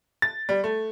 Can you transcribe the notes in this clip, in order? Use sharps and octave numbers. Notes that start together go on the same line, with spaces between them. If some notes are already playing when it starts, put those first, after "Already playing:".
A6
G3
A3